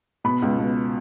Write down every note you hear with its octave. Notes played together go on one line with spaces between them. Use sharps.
B2 B5
C#2
B2